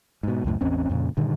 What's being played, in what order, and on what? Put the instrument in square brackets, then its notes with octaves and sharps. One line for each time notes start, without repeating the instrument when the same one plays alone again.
[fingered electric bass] G#2 B2
C#2 F#2 A2
A1 E2 C4 C#4
F2 A#2 C#3
G2 A#2 D3 D#3